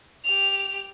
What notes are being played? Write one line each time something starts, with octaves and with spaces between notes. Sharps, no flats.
G4 F7